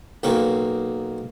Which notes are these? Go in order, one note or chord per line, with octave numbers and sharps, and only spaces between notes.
B1 A#3 C4 C#6 D6